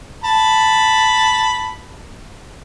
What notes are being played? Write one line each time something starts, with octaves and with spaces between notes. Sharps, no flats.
A5 B5